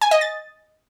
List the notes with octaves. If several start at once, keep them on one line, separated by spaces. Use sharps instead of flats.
G#5
D#5
A6